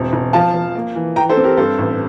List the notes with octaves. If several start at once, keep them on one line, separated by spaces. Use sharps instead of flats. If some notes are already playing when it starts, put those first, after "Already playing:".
Already playing: E1 C4
E1
F3 F5 A5
F3
A#3
E3
E3 G5 A#5
A4 C5
C4
G4 A#4
G2 A4 C5
A1